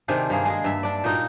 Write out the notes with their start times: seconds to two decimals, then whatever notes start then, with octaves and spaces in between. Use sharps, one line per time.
0.08 C3 D#3 D4 G#4
0.30 G2 A#3 G#4
0.45 G#3 G#4
0.64 G2 E5
0.83 D4 D5
1.04 A#2 D#4 F#4